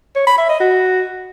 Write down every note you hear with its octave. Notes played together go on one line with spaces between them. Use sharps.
C#5
B5
E5
D#5
F#4